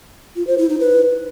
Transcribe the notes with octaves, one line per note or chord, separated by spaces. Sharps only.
F4
C5
E4
D#4
B4